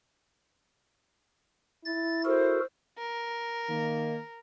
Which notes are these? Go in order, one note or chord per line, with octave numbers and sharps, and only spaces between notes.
E4 A6
F#4 A4 A#4 C5
A#4
D#3 A#3